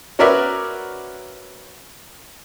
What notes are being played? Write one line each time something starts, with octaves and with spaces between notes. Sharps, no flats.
C#4 F#4 A#4 B4 D5 E5